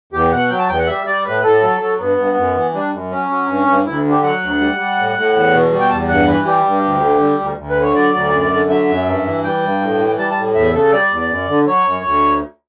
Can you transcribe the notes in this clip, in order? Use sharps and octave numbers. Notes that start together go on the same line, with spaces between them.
E2 G4
B2 F#5
F#3 G5
A5
E2 G5
F#5
G3 E5
G3 D5
A2 B4
A2 A4
F#3
F#3
G2 B3
G2
F#2
E3
G3 D4
F#2
F#3 C#4
F#3
G2
G2
D2 E4
D3
G4
F#3 F#5
D2
G3
G3
A2
A2
E2
B2
G3
G5
E2 A5
G2 F#5
E3 B4
G3 G4
G2
D2
D3
G3
D2
D2
B4
D3
C#5
F#3 D5
D2
F#2
D3
F#3 E5
F#2
G2
E3
G3 G5
G2
A2
E3
G3 A5
A5
A2
E2 E5
C#3 A4
G3 D5
E2
F#2
D3
F#3 C#5
F#2
D2